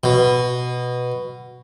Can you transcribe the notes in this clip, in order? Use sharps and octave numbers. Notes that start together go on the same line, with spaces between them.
B2